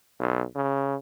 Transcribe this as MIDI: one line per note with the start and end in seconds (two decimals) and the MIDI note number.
0.19 0.44 35
0.55 0.96 49